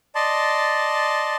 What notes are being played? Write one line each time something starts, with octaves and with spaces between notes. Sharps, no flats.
D5 D#5 A5 C6